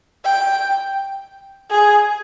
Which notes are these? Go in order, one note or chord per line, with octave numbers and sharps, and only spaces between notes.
G5
G#4